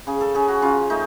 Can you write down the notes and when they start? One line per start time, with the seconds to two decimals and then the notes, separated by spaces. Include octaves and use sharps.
0.07 C#3 G#4
0.21 A4
0.35 C#3 G#4
0.48 F#4
0.62 C#3 F4
0.90 A3 D#4